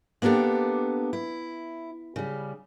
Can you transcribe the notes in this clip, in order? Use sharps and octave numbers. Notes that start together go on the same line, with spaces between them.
A#3 B3 D4 G4 A4
E4
C#3 G3